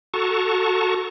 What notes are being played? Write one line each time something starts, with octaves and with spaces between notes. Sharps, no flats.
F#4 A4 A5 A#5 C#6